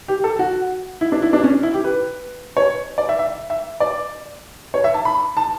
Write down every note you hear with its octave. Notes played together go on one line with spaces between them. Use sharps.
G4
A4
F#4
E4
D4
E4
D4
C#4
E4
G4
B4
C#5
D5
E5
E5
E5
D5
C#5
E5
A5
B5
A5